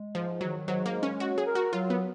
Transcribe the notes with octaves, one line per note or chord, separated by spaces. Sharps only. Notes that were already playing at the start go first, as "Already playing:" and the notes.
Already playing: G#3
G#2 F3
D#3 F#3
G#2 F#3
A#3
G#3
C#4
F#3 F#4
G#4
A#4
F#4
F#3 F4
B3